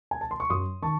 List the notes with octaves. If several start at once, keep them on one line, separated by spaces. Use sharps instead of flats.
G#5
A5
C6
C#6
F#2 C6 D#6
D#3 A5 C#6